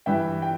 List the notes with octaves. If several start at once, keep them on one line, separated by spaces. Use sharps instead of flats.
G2 E3 G3 E5 G5
G5